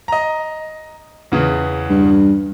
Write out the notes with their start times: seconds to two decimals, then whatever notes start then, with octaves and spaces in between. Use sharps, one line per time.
0.08 D#5 A#5
1.32 E2 C#3 E3
1.90 G2